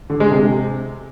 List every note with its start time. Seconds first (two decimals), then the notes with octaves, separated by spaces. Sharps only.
0.10 D3
0.20 G#3
0.31 C3